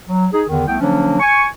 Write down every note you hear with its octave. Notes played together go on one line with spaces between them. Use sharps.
F#3
D#4 G#4
E2 D3 D#3
C2 A3 B3 G5
D3 F3 F#3 A#3 C#4 D4
G#5 C#6